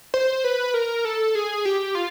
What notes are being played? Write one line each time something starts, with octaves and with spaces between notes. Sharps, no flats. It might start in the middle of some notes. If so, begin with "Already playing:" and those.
C5
B4
A#4
A4
G#4
G4
F4